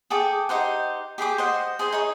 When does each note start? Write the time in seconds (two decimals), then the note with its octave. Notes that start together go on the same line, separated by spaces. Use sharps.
0.10 G#4 A4 G5 D6
0.49 D#4 G4 C5 F#5
1.18 G4 G#4 B5 D6
1.38 C5 D#5 F#5
1.79 G#4 C5 G#5
1.92 D#4 G#4 C#5